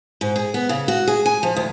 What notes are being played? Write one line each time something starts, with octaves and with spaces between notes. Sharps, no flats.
G#2
G#4
B3
C#3
F#4
G#4
G#5
F3
D2